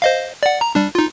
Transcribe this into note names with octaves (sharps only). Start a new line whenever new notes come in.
C5 D#5 F5
D5 F#5
A#5
G3 D4
D#4 F4